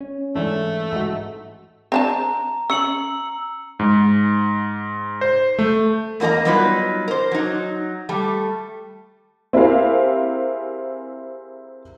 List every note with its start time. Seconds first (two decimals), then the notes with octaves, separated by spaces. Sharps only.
0.01 C#4
0.36 G#2 E3 A3 C#4 D4
0.92 G#2 D#4 F#4
1.92 C4 D4 A5 A#5
2.70 C#4 E6 C#7 F#7
3.79 G#2
5.21 C5
5.59 A3
6.20 E2 A#3 F4 D#5 A#5
6.45 F#3 G3 B3 D#4 F4 B4
7.08 A#4 C5
7.32 F#3 D#4
8.09 G3 A3
9.53 C4 E4 G4 G#4 A#4 F5